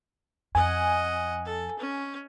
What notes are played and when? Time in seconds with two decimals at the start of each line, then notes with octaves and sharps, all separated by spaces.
0.55 F2 D#5 F#5 G#5
1.45 A4
1.79 C#4